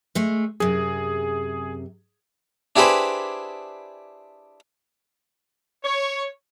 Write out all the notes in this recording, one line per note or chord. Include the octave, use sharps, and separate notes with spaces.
G#3 A3
F#2 C3 G#4
D4 E4 G4 G#4 B4 C5
C#5